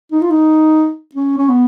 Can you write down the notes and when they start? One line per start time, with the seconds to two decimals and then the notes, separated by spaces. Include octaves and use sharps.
0.12 D#4
0.22 F4
0.30 D#4
1.15 C#4
1.38 C#4
1.49 B3